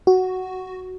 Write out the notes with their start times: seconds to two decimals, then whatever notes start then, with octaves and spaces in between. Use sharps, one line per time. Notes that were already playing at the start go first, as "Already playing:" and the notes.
0.07 F#4